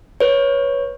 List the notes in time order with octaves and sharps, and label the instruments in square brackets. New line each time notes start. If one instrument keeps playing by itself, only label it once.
[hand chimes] B4 C#5